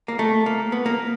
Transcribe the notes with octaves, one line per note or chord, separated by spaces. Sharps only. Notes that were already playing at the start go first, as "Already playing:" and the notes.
A#3
A3
A#3
B3
A#3